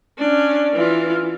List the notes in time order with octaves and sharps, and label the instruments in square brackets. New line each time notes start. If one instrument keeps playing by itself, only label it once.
[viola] C#4 D4
E3 F4